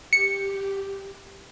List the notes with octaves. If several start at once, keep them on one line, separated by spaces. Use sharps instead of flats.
G4 C#7